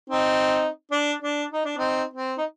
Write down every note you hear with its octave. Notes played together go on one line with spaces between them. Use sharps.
C4 D#4
D4
D4
D#4
D4
C4 D#4
C4
D#4